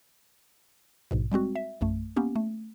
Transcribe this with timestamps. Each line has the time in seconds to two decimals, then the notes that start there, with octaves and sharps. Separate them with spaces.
1.11 A#1 G#2 B2
1.32 G3 G#3 C4 F#4
1.55 E5
1.81 A#1 F#2 A3
2.16 A#3 B3 C#4 G4
2.36 A3